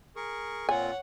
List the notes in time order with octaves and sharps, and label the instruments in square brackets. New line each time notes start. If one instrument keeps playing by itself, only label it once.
[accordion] G#4 A#4 C#6
[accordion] A#2 C4 F4 [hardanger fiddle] C#5 F#5 [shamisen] G#5